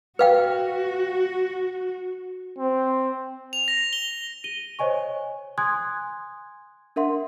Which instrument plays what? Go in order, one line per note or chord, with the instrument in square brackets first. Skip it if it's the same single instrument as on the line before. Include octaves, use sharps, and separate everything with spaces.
[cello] F#4 [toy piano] B4 F5 G5
[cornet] C4
[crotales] F7
A#6
G7
[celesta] D#7 G7
C5 C#5 D#5 G#5 C#6
G#5 C6 D#6 F#6 G#6
D4 A#4 E5 F#5 C6